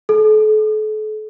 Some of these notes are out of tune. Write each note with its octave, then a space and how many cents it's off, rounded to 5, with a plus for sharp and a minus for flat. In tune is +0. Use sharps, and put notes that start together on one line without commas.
A4 -40